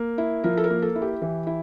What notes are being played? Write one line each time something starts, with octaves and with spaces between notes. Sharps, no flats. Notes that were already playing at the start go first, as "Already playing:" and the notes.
Already playing: A#3
E4
F3 A#4
A4
A#4
A#3
A4
E4
G4
E3
E4